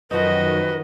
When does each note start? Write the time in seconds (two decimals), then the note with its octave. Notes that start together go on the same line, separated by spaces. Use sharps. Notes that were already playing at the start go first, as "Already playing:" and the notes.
0.11 F#2 D#3 F3 D#4 F#4 B4 D#5